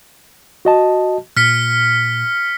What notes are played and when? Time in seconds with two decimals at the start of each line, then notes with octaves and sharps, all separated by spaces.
0.65 F#4 D#5 A5
1.37 A#2 F6 B6 C#7